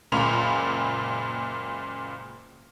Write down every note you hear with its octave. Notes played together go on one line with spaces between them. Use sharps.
F#1 C#2 A#2 A#3 B5 F7